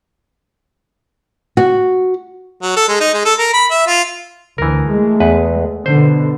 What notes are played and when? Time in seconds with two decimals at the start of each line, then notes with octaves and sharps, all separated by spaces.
1.57 F#4
2.62 F#3
2.76 A4
2.88 G#3
3.00 D#4
3.14 G#3
3.25 A4
3.38 A#4
3.54 B5
3.70 E5
3.87 F4
4.58 D2 E3 A#4
4.89 G#3 A3
5.20 E2 B4
5.86 B2 D3 C5